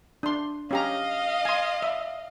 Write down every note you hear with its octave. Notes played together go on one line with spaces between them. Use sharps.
D4 C6
C#4 G4 D#5 F5 A#5
G#5 C6
E5